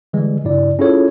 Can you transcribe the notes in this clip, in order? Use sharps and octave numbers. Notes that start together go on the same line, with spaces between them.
D3 E3 G3 G#3
G2 C#3 E4 D5
C#4 E4 F4 G#4 A4 C#5